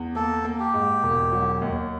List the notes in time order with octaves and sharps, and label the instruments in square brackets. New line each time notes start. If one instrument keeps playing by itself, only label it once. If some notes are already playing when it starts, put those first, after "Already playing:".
Already playing: [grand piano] E2
[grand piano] A#3 [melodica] A4
[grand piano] A#3
[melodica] G4
[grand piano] G#2
E1
F#3
D#2